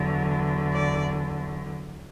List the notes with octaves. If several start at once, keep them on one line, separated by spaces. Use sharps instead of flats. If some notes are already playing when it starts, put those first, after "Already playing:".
Already playing: E2 D3 F#3
D5